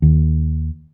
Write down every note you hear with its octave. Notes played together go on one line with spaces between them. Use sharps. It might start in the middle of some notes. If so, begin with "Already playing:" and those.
D#2